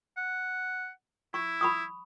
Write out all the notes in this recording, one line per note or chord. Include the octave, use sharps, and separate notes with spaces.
F#5
E4 C#6
B5 C#6 D#6